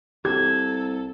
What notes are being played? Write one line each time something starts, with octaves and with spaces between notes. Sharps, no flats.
C2 G4 A4 G#6